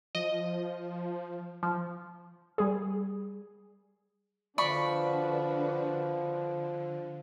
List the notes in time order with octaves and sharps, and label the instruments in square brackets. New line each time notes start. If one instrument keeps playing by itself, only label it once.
[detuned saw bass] F3 [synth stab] D#5
[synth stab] F3
[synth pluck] G3 G#4
[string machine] D3 [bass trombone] F3 [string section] D4 F#4 B4 [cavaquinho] D5 B5 C#6